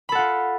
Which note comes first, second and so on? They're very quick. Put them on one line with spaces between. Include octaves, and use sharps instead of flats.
B5 A4 F#5 F4